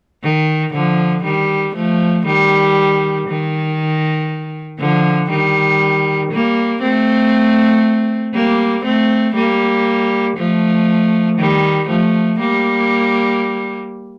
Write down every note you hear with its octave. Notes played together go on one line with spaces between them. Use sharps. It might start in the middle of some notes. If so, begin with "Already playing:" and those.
D#3
D3 F3
D#3 G3
F3 A3
D#3 G3
D#3
D3 F3
D#3 G3
G3 A#3
A3 C4
G3 A#3
A3 C4
G3 A#3
F3 A3
D#3 G3
F3 A3
G3 A#3